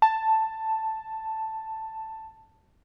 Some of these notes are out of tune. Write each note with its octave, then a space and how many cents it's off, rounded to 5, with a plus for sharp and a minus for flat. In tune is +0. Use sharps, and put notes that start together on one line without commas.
A5 +5